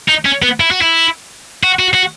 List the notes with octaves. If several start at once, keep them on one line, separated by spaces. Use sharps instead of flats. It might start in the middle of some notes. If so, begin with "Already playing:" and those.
D#4
C#4
B3
E4
F#4
E4
F#4
F#4
F#4